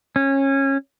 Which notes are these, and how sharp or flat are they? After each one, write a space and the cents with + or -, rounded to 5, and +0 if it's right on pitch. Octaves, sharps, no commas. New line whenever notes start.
C#4 -20